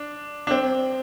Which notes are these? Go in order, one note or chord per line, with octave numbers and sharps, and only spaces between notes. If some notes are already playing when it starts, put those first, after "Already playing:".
Already playing: D4
D4
C4